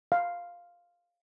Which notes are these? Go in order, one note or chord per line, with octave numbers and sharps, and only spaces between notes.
F5